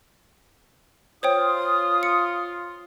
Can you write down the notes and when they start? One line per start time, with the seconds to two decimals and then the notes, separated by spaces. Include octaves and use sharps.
1.23 F4 C5 C#5 G5 D#6
2.03 C#7